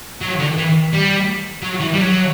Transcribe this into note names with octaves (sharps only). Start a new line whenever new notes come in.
F#3
D3
E3
G3
F#3
E3
G3
F#3